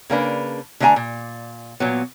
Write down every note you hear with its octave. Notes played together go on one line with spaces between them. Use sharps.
C#3 A#3 D4 B4
D3 A3 D4 C#5 G#5 A#5
A#2
A#2 F#3 B3